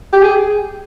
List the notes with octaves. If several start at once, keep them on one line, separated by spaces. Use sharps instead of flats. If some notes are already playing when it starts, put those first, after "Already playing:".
G4
G#4